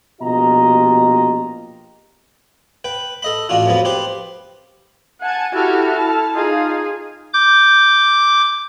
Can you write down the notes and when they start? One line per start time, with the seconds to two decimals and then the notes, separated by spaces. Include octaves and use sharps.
0.21 A#1 B2 F4 G4 D#5 A#5
2.84 B4 G5
3.23 A4 D#5 B5
3.49 A1 D4 F4 F#4
3.66 F2 F3 F#3 B3
3.85 G4 B4 C5
5.22 F#5 G#5 A5 G#6
5.54 E4 F#4 G4 A4 F6
5.96 A5
6.35 D#4 F4 G#4 F5
7.33 D6 G6